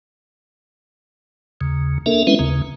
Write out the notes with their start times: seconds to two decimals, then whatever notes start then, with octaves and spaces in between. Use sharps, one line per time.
1.61 D#2 C#3
2.06 A#3 D4 A4 A#4 E5
2.27 G#3 C4 C#4 E4 B4 E5
2.39 D#2 C#3